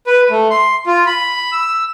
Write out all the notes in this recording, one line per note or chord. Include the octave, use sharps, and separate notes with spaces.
B4
A3
C6
F4
B5
E6